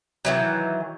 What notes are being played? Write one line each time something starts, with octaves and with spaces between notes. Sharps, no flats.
D#3 E3 F#3